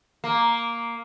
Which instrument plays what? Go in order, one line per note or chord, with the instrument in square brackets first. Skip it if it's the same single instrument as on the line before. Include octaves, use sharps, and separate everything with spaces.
[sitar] A#3